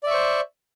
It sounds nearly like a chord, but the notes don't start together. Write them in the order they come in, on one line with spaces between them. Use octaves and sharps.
D5 E5 C#6 C5